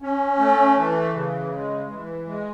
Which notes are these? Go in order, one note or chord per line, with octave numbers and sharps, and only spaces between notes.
C#4
A3
E3
C#3
G#3
E3
G#3